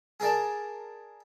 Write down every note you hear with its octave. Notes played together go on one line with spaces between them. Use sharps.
G#4 A#4 D5 A5